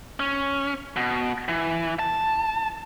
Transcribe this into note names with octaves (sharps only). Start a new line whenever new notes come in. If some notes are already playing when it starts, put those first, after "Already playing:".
C#4
B2
E3
A5